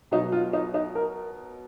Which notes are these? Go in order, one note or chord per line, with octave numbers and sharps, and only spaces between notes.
B2 F#3 D#4
F4
D#4
D#4
A#4